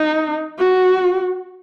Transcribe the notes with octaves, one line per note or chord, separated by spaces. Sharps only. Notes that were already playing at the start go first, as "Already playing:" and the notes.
Already playing: D#4
F#4